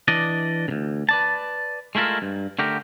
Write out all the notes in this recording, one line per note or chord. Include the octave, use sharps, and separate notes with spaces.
E3 D4 D5 D#5
D2 C#3
B4 D5 A5
G#3 A3 E4 F4 A#4
G2
D3 A3 G4 A#4